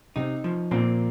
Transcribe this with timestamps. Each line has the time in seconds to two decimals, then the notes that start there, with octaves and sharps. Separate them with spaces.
0.16 C3 C4 D#4
0.44 F3
0.71 A#2 A#3 C4